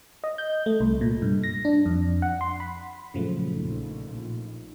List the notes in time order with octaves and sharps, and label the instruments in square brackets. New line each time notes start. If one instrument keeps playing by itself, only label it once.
[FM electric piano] D#5
G6
A3
C2
A#2
G2
A#6
D4
F2
F#5
C6
B5
[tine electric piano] F#2 A#2 F#3 [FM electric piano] C#3 F3 A3
[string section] A#1 [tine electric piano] D#4